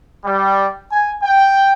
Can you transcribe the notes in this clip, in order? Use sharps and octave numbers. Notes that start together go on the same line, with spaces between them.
G3
G#5
G5